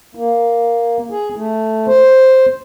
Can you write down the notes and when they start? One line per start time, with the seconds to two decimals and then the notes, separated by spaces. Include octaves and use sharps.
0.15 A#3
1.11 G#4
1.36 A3
1.87 C5